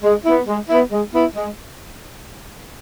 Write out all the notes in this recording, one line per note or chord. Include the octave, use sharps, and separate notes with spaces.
G#3
B3 E4
G#3
B3 E4
G#3
B3 E4
G#3